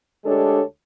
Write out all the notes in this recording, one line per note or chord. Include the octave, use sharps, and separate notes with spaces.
D2 G#3 D4 G4 A4 C#5